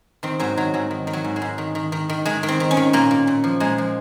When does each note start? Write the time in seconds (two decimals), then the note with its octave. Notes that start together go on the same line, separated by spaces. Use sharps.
0.23 D#3 C4
0.39 G#2 F#3
0.57 D#3 F#3
0.74 G#2 F#3
0.91 D#3
1.07 D#3
1.13 F#3
1.24 G#2
1.36 G#3
1.42 G#2
1.58 D#3
1.75 D#3
1.92 D#3
2.09 D#3
2.25 D#3 G#3
2.43 D#3
2.48 C4
2.60 D#3
2.71 C#4
2.77 D#3
2.93 A#2 A#3
3.11 A#2
3.27 A#2
3.44 F3
3.60 A#2 G#3
3.78 F3